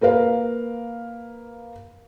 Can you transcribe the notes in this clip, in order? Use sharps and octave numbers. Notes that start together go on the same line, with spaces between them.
A#3 A#4 B4 F5